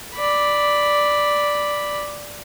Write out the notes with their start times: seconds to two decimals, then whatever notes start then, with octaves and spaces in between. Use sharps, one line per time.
0.15 D5 B5